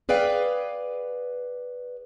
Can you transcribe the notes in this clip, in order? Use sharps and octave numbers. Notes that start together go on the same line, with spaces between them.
G#4 B4 D5 F5 G5